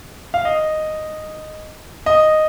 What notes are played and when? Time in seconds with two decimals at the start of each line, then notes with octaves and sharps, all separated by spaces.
0.34 F5
0.45 D#5
2.06 D#5